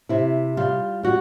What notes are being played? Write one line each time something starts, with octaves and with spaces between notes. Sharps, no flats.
C3 E4
G3 F4
G3 F#4